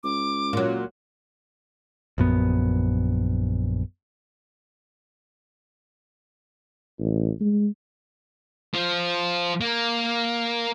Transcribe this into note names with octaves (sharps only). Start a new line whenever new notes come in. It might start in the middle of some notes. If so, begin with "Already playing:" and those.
C#2 D6
A#2 F#3
A#1 F#2 B3
A1
G#3
F3
A#3